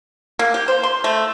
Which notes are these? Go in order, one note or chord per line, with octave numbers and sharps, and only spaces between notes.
A#3
G4
C5
C6
A3